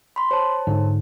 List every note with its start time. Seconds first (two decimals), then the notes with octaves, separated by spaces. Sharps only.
0.16 B5 C6
0.31 C5 C#5 A5
0.67 G#2 D3